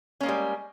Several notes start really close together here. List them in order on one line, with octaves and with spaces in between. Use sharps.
C#4 A#3 G#3 G3